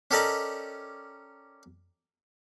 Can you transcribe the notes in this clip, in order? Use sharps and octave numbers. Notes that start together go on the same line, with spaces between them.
C#4 G4 A4 A#4 D5 D#5